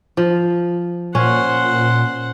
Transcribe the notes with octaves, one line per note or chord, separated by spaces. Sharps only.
F3
A#2 C#4 C5 F#5